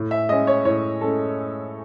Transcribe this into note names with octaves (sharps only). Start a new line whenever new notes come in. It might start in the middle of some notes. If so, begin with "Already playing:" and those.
Already playing: A2
E5
G#3 C#4 D#5
C#5
A2 C#5
G#3 C#4 A4